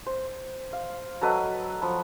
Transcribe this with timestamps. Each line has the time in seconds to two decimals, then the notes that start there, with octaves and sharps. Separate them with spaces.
0.06 C5
0.73 F5
1.21 F#3 A4 B4 D#5
1.82 F3 B5